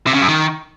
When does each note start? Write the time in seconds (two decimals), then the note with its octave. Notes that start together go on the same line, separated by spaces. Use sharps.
0.07 C3
0.14 C#3
0.21 F#2
0.29 D#3